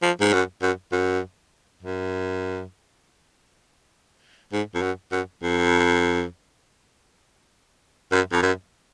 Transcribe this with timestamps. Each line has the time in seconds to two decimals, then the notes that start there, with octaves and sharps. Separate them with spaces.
0.02 F3
0.21 G#2
0.33 F#2
0.62 F#2
0.92 F#2
1.82 F#2
4.53 G#2
4.74 F2
4.82 F#2
5.12 F#2
5.43 F2
8.12 F#2
8.32 F2
8.42 F#2